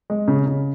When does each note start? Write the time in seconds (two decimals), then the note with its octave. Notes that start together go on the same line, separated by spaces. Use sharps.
0.10 G#3
0.28 C#3
0.46 C#3